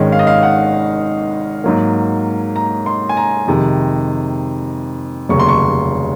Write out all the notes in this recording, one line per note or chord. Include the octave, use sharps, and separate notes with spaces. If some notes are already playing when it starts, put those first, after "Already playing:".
Already playing: G#1 G#2 D#3 G#3 C#4
F5
D#5
F5
F#5
G#2 F#3 A#3
A#5
C6
G#5
A#5
F2 C3 D#3 G#3
F1 D#2 C#3 F#3 C#6
C6
C#6